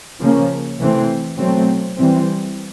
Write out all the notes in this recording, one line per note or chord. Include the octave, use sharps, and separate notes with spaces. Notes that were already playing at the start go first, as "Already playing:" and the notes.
C#3 F3 A#3 C#4
C3 E3 A3 C4
B2 F#3 A3 C4
E3 G3 C4